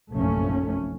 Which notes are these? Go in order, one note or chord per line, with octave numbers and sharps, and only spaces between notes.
F1 A#1 F#2 A3 C#4